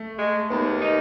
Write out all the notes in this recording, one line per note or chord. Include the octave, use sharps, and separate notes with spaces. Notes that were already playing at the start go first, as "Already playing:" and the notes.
Already playing: A3
G#3
D#2 B3
D#4